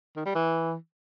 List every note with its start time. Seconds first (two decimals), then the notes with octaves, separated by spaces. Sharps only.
0.17 D#3
0.26 G3
0.35 E3